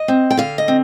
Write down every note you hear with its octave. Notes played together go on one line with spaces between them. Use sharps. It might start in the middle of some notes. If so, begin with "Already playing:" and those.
Already playing: D#5
C4
G5
D3 F5
D#5
C4